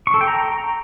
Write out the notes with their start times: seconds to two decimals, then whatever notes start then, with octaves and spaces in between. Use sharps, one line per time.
0.07 C#6
0.14 A4
0.21 G5
0.28 A#5